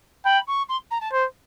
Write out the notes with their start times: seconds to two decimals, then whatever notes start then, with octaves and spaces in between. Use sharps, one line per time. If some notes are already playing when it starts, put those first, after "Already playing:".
0.25 G5 B5
0.47 C#6
0.69 C6
0.91 A#5
1.01 A5
1.12 C5